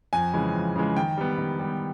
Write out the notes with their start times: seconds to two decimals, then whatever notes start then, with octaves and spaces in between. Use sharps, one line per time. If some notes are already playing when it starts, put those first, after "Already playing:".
0.13 F2 G#5
0.33 C#3 E3 G#3
0.55 F2
0.76 C#3 E3 G#3
0.96 D#3 G5
1.18 G3 B3
1.38 D#3
1.59 G3 B3